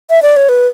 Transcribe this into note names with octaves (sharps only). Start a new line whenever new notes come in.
E5
D5
C#5
B4